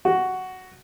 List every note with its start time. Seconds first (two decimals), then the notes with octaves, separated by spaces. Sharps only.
0.05 F#4